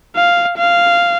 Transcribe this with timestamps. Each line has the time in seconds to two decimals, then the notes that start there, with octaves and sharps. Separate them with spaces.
0.16 F5
0.58 F5